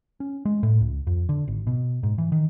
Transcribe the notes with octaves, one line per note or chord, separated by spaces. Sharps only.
C#4
G#3
A2
C#2
F2
D3
G#1
B2
G#2
E3
D#3